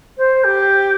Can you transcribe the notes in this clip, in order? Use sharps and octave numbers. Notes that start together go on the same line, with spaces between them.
C5
G4